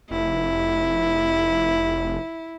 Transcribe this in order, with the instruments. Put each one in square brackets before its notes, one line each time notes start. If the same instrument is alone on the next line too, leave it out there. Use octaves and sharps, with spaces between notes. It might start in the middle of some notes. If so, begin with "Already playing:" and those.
[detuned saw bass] F1 [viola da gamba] E4